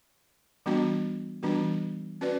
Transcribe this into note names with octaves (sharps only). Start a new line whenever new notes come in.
E3 G3 B3 D4 F#4
E3 G3 B3 D4 F#4
C#4 F#4 B4 D5